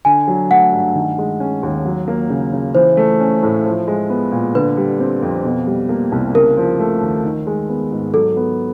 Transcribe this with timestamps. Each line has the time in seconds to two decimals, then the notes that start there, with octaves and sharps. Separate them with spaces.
0.05 D3 G#5
0.28 F#3
0.50 A3 F#5
0.73 G2
0.95 D#3
1.18 G#3
1.40 C#4
1.63 D#2
1.86 F#3
2.08 A#3
2.30 C#3
2.53 C#3
2.75 E3 C5
2.97 A3
3.20 C#4
3.43 A2
3.65 F3
3.88 G#3
4.10 B3
4.32 A#2
4.55 D3 B4
4.77 G3
5.00 C4
5.22 F2
5.45 B2
5.67 G3
5.89 A#3
6.12 C2
6.34 C#3 A#4
6.57 F3
6.79 A3
7.01 D#2
7.24 D#3
7.47 G#3
7.69 B3
7.92 G#2
8.14 F#3 A4
8.37 B3